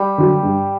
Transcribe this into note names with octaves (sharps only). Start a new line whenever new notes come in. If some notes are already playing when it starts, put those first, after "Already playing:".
Already playing: G3
D3 F#3
G2